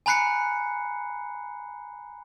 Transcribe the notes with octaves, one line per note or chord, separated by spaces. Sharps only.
G#5 A#5 B5 F#6 C7 C#7